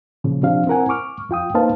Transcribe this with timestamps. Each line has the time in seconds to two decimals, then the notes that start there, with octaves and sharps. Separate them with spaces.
0.24 A#2 C#3 F3
0.43 C3 F3 D4 F5
0.67 C4 E4 A#4 F#5 G#5
0.89 C#6 D6 F6
1.29 F2 F4 G5 D#6
1.55 A#3 D#4 B4 C5 F5 A5